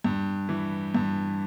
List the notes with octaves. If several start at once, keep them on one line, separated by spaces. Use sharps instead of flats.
G2
E3
G2